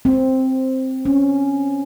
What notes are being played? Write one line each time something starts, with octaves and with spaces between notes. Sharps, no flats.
C4
C#4